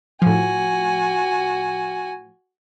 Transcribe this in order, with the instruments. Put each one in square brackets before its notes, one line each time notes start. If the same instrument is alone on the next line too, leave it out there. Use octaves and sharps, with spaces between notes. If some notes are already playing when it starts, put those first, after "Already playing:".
[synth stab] A2 F3 [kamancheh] F#4 G#5